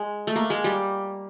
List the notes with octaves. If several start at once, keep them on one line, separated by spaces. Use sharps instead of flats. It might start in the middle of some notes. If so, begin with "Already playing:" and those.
Already playing: G#3
A3
A#3
G#3
G3